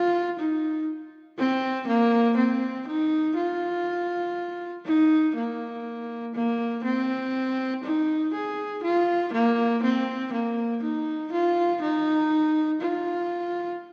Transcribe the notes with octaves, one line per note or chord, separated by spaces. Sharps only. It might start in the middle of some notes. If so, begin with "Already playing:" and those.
Already playing: F4
D#4
C4
A#3
C4
D#4
F4
D#4
A#3
A#3
C4
D#4
G#4
F4
A#3
C4
A#3
D#4
F4
D#4
F4